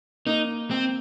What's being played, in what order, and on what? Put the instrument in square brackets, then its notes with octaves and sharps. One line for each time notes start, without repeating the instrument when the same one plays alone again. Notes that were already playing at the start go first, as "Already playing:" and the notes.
[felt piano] A#3 [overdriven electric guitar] D#4
[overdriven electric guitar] C4